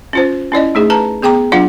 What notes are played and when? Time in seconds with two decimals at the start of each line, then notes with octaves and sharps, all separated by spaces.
0.13 C#4 F4 C5
0.52 C#4 E4 D5 D#5
0.75 A3 D#4 G#4
0.90 B4 A5 A#5
1.22 B3 G#4 G5 A#5 D6
1.52 F#3 D4 F4 F5 F#5